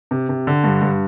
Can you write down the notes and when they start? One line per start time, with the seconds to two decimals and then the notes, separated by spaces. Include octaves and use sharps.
0.11 C3
0.29 C3
0.47 D3
0.64 G2
0.82 G2